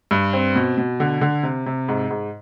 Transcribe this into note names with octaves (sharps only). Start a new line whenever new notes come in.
G2
C4
B2
B2
D3
D3
C3
C3
G#2
G#2